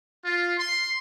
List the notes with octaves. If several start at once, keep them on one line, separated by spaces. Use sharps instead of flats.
F4
C6